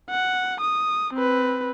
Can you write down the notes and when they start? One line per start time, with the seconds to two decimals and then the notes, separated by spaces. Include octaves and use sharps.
0.10 F#5
0.61 D#6
1.14 C4 B4